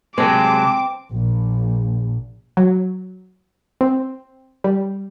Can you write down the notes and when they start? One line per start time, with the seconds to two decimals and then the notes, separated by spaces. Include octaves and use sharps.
0.18 C3 F#3 G#3 C4 A5 D6
1.11 A#1
2.57 F#3
3.81 C4
4.64 G3